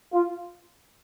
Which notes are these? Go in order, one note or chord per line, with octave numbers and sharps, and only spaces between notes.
F4